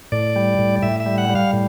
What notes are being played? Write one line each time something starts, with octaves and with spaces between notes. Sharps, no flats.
A2 D5
G3
A2
A2 E5
E5
G3
F#5
G3
F5
A2